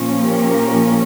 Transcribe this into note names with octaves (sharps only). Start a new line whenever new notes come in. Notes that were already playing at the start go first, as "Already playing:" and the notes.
Already playing: A#2 F3 A#3 C#4
G4 A#4